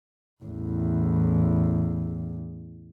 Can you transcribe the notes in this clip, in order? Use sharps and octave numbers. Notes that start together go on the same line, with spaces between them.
A1 E2